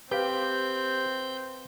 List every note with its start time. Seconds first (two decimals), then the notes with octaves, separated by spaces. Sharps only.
0.11 C4 G4 B4 C5 F5 G6